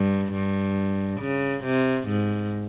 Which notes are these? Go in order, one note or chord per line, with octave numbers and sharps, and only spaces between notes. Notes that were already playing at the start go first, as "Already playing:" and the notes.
Already playing: G2
G2
C#3
C3
G#2